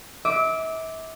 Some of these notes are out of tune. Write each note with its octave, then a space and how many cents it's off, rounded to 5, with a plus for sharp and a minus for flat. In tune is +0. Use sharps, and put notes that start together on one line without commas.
E5 -35 D6 +0